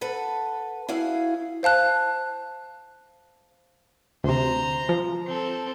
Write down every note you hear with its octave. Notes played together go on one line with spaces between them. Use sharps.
A4 B4 F#5
E4 F#4 G#4 F5
C5 F5 A5 F#6
D2 C3 C5 A#5
F3
C4 A4